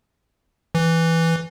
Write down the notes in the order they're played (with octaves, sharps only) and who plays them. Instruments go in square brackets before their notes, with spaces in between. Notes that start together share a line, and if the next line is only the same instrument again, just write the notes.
[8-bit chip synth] E3